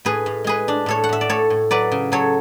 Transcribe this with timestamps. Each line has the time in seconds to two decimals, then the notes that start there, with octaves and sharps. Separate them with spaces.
0.05 A2 G#4 B4
0.26 A2
0.44 G#3 G#4 B4
0.68 D4
0.86 A2 A4 C#5
1.04 F#5
1.09 A2 E5
1.21 D5
1.29 A2 A4 C#5
1.50 A2
1.71 F#3 B4 D5
1.92 C#3
2.12 F#3 A4 C#5